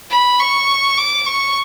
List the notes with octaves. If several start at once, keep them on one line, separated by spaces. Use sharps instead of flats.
B5
C#6
D6
C#6